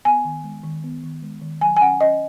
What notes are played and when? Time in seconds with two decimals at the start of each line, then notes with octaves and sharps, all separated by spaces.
0.05 B3 G#5
0.25 D#3
0.44 G#3
0.64 D#3
0.84 B3
1.03 D#3
1.22 G#3
1.42 D#3
1.61 F#3 G#5
1.76 G#5
1.81 C#4 F#5
2.01 C#4 D#5